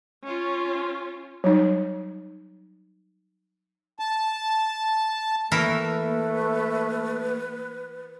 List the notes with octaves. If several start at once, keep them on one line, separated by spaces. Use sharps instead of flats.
C#4 F4
F#3 G3 D#4
A5
E3 A3 A#3 A#4 B4 E5